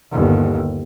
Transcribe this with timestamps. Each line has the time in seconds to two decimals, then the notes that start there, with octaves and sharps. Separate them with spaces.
0.12 G1 D#2